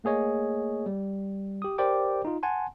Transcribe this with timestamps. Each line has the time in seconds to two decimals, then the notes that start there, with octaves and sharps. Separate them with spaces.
0.04 A3 A#3 G#4 C#5 D#5
0.86 G3
1.62 G4 D#6
1.78 G4 A#4 C5 D5 G5 D6
2.25 D#4 F4
2.43 F#5 G#5 A5 C6